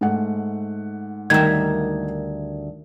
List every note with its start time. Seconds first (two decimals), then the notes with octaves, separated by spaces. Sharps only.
0.01 G#2 A3 F#5
1.30 D2 D#3 G3 A#4 E5 G#6